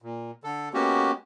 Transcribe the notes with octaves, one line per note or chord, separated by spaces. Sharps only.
A#2
D3 A4
G#3 A#3 B3 C#4 F#4 G4